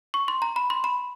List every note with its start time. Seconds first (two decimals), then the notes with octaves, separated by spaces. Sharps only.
0.14 C#6
0.28 C6
0.42 A#5
0.56 B5
0.70 C6
0.84 B5